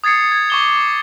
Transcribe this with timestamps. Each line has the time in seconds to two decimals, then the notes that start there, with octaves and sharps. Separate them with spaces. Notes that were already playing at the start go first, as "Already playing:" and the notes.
0.04 D#6 G#6 A6 C7 C#7
0.32 G#6
0.50 C#6 D6 G7